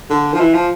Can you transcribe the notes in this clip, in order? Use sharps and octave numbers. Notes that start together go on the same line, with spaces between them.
D3
F3
E3
F3